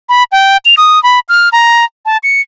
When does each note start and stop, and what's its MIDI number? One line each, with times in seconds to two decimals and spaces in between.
0.09 0.23 83
0.32 0.57 79
0.65 0.74 101
0.77 1.01 87
1.03 1.19 83
1.29 1.49 89
1.52 1.84 82
2.06 2.17 81
2.23 2.41 97